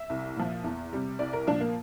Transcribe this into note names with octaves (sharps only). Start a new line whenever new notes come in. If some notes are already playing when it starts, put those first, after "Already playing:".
Already playing: E5
C2
A#2 F3
E2
C3 G3
C2 D5
A#4
A#2 F3 D4
A#3